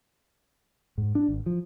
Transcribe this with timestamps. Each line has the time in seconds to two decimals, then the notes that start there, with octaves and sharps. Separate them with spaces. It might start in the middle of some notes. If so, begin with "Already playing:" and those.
0.98 G#2
1.15 D4
1.29 G#1
1.46 F3